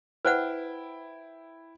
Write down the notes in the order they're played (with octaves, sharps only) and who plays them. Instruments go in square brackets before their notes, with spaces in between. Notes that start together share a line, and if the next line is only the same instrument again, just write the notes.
[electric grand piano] E4 G5 [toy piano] B4 C5 F#5